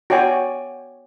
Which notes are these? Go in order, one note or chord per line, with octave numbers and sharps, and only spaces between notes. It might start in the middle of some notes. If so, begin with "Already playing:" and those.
F#4 C#5 D5 G5 G#5